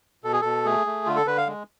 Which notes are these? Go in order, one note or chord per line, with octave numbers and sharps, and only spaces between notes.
B2 A4
G#4
B2 A4
A3 G#4
A3
D3 F4
A4
D3 B4
F5
G#3